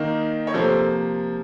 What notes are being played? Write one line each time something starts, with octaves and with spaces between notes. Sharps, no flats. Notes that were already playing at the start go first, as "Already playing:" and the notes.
Already playing: D#3 A#3 D#4
C#5
C3 F3 A#3 A4 C5